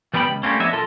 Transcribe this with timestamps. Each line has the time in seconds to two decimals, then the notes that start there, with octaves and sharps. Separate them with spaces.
0.14 E3 G3 B3 G5 B5
0.26 C#2
0.43 G3 A3 A#3 C4 C#4
0.60 F3 B3 D4 C#5 D#5 E5
0.73 B1 F4 A4 A#4